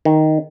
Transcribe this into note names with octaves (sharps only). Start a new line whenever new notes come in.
D#3